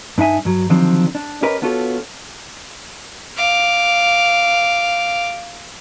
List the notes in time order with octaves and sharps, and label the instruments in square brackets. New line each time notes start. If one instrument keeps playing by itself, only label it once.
[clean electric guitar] G2 D4 D#4 E5 G#5
G2 F#3
D3 D#3 F3 F#3 C4 D4
D4
C#4 G4 A#4 B4 C#5 D#5
B3 D4 F4 F#4 A4 C#5
[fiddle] F5 D6